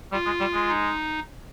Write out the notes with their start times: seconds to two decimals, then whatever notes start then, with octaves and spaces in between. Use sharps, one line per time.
0.12 G3 F4
0.26 G#3
0.40 G3
0.54 G#3
0.69 D#4